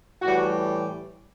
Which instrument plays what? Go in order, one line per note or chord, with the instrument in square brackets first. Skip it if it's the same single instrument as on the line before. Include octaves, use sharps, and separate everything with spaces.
[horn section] A2 E3 G3 F#4